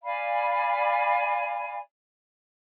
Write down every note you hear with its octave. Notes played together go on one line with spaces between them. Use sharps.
D5 F5 G#5 B5